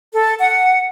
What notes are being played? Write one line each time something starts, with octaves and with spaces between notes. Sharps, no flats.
A4
F#5